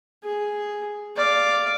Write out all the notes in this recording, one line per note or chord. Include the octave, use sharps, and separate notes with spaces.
G#4
D5 F5